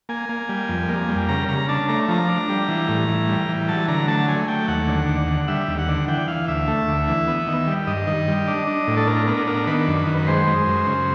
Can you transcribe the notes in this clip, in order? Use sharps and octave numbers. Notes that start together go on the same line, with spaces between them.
A#3 G#5
A#3
G3
F2
A#3
G3
C#3 A#5
C#3 A#5
D4 A5
A3 A#5
F3 A#5
D4
G3
E3
A2
E3
G3
E3
F#3 A5
D3 A#5
A3 A5
F#3 G#5
A3 G5
D#2 F#5
D3
D#2
D3
G3 E5
D#2
F#5
D3
E3 G5
E3 F5
D2 E5
A3
D2
E3
B3
D#3
G3
G2 D#5
D#3
G3
D4
D4
A2
A4
D4 A#4
B3 A#4
D4 A#4
D#3 B4
F#2
D#3
B4
G#3 C5
G#3
F#2
C#3